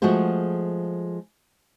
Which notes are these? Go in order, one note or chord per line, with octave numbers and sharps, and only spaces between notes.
F3 G#3 A3 F#4 G#4 C5